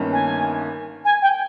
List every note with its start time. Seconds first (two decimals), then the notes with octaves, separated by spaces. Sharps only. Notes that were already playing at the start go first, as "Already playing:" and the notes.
Already playing: G1 G2 D#3 A#3 C#4
0.12 G#5
1.04 G#5
1.22 G5